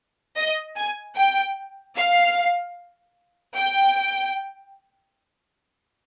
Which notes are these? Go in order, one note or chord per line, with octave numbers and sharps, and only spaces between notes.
D#5
G#5
G5
F5
G5